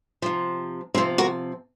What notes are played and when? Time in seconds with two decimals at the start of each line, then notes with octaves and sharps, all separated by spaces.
0.22 C3 F3
0.94 C3 F3 C4
1.18 F#4 A#4